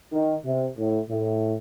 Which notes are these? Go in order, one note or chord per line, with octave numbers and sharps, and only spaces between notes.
D#3
C3
A2
A2